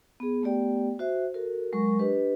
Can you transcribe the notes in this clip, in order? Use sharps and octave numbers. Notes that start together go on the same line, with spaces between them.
B3 G#4
A3 B3 G4 D5 G5
F#4 C5 E5
F#4 A4 A#4
F#3 G#3 A#4 C#6
D4 G4 B4 D#5